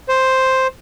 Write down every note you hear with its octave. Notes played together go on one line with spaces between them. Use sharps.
C5